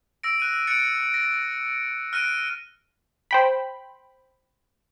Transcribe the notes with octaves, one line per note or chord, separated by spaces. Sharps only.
E6 A#6 D7
F#6 D#7
F#6 A6 C#7 D7
A#6
F6 F#6 A#6 D7 D#7
C5 G5 B5